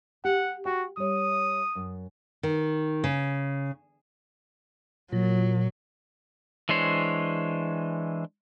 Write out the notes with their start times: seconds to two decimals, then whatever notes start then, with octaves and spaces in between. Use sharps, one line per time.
0.25 G4 F#5
0.65 F#4 G5
0.97 G3 C#5 D#6
1.75 F#2
2.43 D#3
3.04 C#3
5.12 A#2 F#3
6.69 E3 G#3 D4 C5 C#5